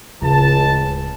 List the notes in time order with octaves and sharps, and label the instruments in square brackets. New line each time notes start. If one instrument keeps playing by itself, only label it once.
[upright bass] D1 C#3 [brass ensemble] C#2 E3 A5